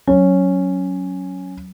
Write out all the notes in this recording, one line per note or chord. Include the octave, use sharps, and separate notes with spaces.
F#3 C#4